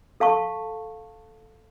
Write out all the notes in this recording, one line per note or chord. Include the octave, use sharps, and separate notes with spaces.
A4 F5 A5 C#6